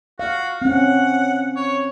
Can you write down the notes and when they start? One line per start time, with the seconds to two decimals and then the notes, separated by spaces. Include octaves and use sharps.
0.19 F#4 F5
0.62 C4 C#4 F#5
1.56 C#5